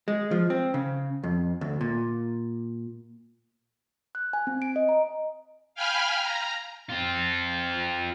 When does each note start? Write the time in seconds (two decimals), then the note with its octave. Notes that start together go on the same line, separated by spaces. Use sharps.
0.08 G#3
0.31 F3
0.50 C4
0.74 C#3
1.23 F2
1.61 D2
1.81 A#2
4.15 F#6
4.33 G#5
4.47 C4
4.62 D7
4.76 D#5
4.89 A#5
5.75 F5 G5 G#5 B5 F6
6.21 A#5
6.89 C4 F4